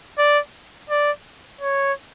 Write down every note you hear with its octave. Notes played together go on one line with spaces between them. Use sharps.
D5
D5
C#5